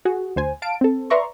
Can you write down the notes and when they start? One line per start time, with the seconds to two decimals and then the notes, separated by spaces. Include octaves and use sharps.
0.05 F#4 G#4
0.36 D2 C5 G#5
0.62 F5 A5 D7
0.81 C4 A4
1.10 B4 D5 E5 A#5 C6 C#6